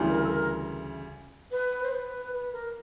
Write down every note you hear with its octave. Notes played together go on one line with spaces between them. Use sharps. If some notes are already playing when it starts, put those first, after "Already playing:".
Already playing: D2 C#3 E3 G3
A#4
A4
A#4
B4
C5
B4
B4
A#4